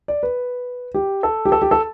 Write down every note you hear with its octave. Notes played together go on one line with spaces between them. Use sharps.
D5
B4
G4
A4
G4
A4
G4
A4